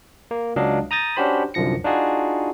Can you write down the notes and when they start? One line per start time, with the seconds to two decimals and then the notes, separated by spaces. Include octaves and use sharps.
0.31 A#3
0.56 C#2 F#3 D4 D#5 F5
0.91 A#5 D#6 G6 A6 A#6
1.16 C#4 D4 F#4 G4 C5 B5
1.54 C2 F#2 D3 F3 A#6 C#7
1.84 D4 D#4 F4 F#4 G#4